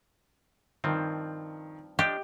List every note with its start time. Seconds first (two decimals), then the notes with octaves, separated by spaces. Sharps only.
0.84 G2 D#3 F3 C4
1.99 F3 D4 G4 D#5